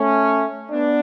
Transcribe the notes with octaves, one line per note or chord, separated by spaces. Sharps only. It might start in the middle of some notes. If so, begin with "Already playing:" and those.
Already playing: A3 C#4
B3 D4